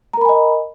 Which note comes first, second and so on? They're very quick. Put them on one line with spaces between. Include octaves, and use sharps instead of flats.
A#5 A#4 B5 G#5 D#5